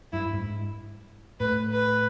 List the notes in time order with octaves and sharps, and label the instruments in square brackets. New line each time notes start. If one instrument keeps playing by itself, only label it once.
[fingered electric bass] G2 [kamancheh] E4
[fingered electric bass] G#2
[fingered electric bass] A2 [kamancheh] B4
[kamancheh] B4